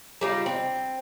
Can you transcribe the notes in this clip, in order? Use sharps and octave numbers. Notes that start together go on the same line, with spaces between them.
G3 D#4 F4
C4